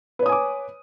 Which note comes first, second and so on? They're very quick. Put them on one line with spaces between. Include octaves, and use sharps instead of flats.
B4 C#5 D#6 G#5 D6